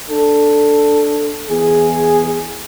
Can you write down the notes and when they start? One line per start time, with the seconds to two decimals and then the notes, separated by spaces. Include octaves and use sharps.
0.11 D4 A4
1.50 E2 G#4